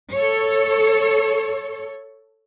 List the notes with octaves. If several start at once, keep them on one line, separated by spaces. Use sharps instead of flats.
A4 C#5